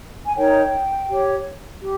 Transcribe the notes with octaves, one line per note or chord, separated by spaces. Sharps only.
G#5
D#4 A#4 C#5 G5
G4 C#5
G4